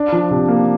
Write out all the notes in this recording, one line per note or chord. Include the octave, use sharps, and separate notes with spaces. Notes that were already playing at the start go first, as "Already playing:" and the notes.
Already playing: D4
F3
C3
A#3